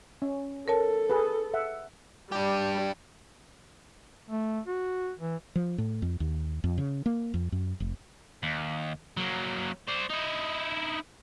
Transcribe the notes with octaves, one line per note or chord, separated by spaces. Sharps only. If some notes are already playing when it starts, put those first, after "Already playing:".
C#4
A4 A#4 C#5 A5
G#4 B4
E5 F#5
G3 D4 G4
A3
F#4
E3
F3
A2
F2
D#2
F2
C#3
A#3
F2
F#2
F1
D#2
F#3 A#3
C5 D5
D#4 E4